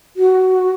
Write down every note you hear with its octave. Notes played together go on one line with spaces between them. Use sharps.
F#4